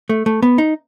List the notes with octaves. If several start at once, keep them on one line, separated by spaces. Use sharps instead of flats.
A3
A3
B3
D#4